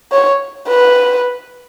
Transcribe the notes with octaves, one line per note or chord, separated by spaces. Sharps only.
C#5
B4